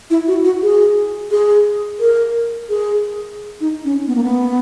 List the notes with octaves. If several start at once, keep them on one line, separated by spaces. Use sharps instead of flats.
E4
F#4
F#4
G#4
G#4
A#4
G#4
D#4
C#4
B3
A#3
B3